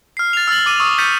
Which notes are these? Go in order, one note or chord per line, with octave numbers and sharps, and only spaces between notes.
F6 C7
A6 F7
E6 F6 A6 F#7
D6 E6 D#7
C#6 D#6 E6
F6 G6 A6 B6 C#7 D#7